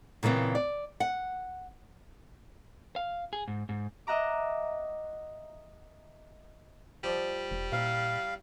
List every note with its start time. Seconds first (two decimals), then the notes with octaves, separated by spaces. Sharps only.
0.23 A#2 C#3 E3 B3 C4
0.55 D5
1.00 F#5
2.96 F5
3.33 G#4
3.48 G#2
3.69 G#2
4.07 D#5 E5 F#5 A#5 D6
7.04 F3 G3 D5 D#5
7.51 E1
7.72 A#2 E4 A#4 F5